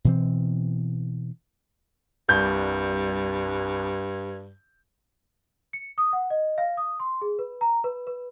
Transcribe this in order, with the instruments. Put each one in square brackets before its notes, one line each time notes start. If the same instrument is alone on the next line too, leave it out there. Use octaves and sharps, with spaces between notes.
[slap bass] B2 E3 C4
[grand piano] C2 G6 [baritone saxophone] G2
[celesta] C#7
D#6
F#5
D#5
F5
D#6
C6
G#4
B4
A#5
B4
B4